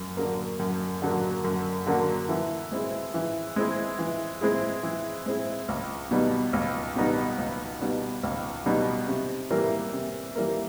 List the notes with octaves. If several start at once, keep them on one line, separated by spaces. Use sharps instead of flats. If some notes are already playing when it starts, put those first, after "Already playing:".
Already playing: F#2
D3 F#3 A#3
F#2
D3 F#3 A#3
F#2
D3 F#3 A#3
E3
G#3 C4 E4 G#4
E3
G#3 C4 E4 G#4
E3
G#3 C4 E4 G#4
E3
G#3 C4 E4 G#4
C#2
B2 G3 B3 D#4
C#2
B2 G3 B3 D#4
C#2
B2 G3 B3 D#4
C#2
B2 G3 B3 D#4
C3
E3 G3 A#3
C3
E3 G3 A#3